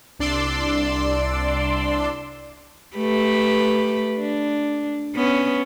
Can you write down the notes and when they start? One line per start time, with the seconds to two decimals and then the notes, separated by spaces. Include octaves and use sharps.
0.19 C2 D4 D5 C6 D6 E6
2.97 A3 G4 B4
4.17 D4
5.15 B3 C#4